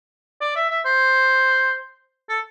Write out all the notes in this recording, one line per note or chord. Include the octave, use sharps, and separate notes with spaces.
D5
E5
E5
C5
A4